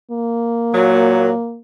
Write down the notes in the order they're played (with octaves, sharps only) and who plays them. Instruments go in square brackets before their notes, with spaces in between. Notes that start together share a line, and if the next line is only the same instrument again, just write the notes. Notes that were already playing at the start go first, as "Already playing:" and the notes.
[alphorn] A#3
[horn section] A#2 F#3